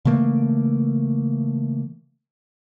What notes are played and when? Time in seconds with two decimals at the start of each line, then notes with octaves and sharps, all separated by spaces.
0.05 C#3 E3 A3 A#3